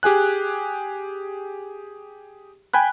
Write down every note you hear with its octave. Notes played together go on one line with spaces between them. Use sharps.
G4 G#4 G#5 F#6
G5 G#5 B5 F#6